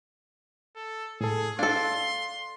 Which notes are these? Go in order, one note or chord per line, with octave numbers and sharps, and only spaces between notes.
A4
A2 G#4 A4
D4 A4 F5 C6